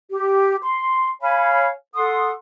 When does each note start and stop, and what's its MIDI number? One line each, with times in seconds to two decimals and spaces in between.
0.11 0.57 67
0.63 1.09 84
1.22 1.68 73
1.22 1.68 77
1.22 1.68 80
1.22 1.68 83
1.95 2.31 69
1.95 2.31 78
1.95 2.31 84
1.95 2.31 87